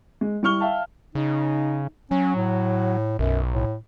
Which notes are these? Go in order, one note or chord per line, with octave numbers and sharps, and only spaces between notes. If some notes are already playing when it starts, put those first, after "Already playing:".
G#3
G3 E4 C#6 F6 G7
E5 F5 G5 A5
C#3 D#4
F#3 C#4
A2
B1 F#2
A2